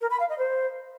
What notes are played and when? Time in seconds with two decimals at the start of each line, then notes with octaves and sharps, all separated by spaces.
0.01 A#4
0.10 B5
0.20 F5
0.29 D#5
0.38 C5